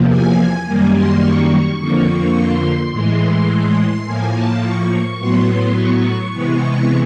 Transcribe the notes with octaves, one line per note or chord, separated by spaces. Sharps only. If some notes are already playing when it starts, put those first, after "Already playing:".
Already playing: E2 C3 F3 A#3
G#5
F#2 D#3 G3 A#3 G#5
C6
C#6
F2 D3 F3 A#3
C6
A2 E3 G#3 C6
C6
A2 F3 A#3 G#5
A5
C#6
A2 F#3 B3 C6
C6
C#6
C3 E3 G#3 B3 C#6